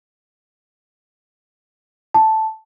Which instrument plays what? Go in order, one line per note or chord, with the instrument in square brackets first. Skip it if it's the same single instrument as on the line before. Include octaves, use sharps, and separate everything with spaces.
[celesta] A5